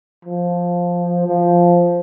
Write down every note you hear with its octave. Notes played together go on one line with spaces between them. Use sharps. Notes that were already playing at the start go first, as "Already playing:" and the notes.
F3
F3